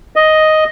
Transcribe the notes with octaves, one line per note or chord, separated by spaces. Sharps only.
D#5